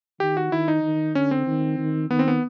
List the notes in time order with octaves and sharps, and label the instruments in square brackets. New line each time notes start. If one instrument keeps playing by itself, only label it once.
[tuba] D#3 [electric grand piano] G4
[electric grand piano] F#4
[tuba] D#3 [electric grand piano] E4
[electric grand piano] D#4
[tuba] D#3
[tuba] D3 [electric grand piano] C#4
[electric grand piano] C4
[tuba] D#3
D#3
[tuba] D#3 [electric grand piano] B3
[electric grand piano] C4
B3